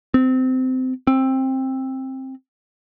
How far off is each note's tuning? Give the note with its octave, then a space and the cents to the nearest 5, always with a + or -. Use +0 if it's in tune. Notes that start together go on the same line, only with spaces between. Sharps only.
C4 -25
C4 +15